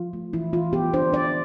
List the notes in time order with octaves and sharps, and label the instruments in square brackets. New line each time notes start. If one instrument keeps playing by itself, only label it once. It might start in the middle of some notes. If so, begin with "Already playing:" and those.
Already playing: [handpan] F3 F4
A3
E3 E4
E3 F4
B3 G4
D4 C5
D4 D5